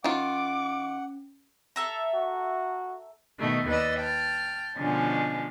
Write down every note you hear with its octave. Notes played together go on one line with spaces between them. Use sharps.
D#3 C#4 F4 F#5 D6
A4 E5 A#5
F#4
B2 D#3 A3
D#2 B4 D5 D#5 E6
G5 A5 F6
B2 D3 F3 G#3 C#4